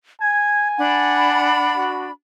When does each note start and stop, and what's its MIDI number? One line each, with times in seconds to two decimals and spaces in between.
0.21 1.55 80
0.21 0.68 92
0.77 2.11 62
0.77 1.84 78
0.77 2.11 83
1.77 2.08 66